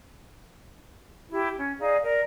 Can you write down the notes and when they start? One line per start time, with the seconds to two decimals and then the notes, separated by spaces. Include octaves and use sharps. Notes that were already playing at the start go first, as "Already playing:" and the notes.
1.31 E4 G4
1.57 C#4
1.80 D#4 G#4 D5 F5
2.02 A#4 D5